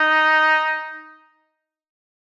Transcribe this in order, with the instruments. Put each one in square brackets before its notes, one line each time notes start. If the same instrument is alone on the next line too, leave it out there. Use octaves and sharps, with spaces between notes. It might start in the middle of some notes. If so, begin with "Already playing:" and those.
Already playing: [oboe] D#4